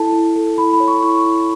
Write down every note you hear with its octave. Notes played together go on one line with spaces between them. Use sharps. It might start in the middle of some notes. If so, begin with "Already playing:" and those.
Already playing: E4 A4 A5
E4
A4
E4 B5
B5
C#5
C#6
E4 C#6
E4